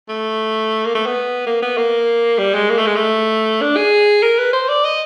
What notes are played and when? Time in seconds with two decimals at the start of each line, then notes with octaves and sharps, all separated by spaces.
0.09 A3
0.86 A#3
0.95 A3
1.06 B3
1.47 A#3
1.62 B3
1.77 A#3
2.38 G3
2.54 G#3
2.70 A#3
2.78 A3
2.87 G#3
2.96 A3
3.61 D4
3.76 G#4
4.22 A#4
4.38 B4
4.53 C5
4.69 D5
4.84 D#5